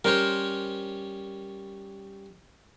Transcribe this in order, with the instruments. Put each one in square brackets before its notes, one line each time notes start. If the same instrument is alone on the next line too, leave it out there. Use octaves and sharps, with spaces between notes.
[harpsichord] G3 C#4 C#5 [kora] A#4 C5